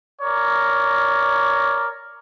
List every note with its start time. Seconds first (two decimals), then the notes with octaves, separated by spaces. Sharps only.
0.22 A#4 C#5 D5